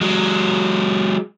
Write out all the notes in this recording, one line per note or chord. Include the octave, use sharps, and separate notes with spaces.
F#3 G#3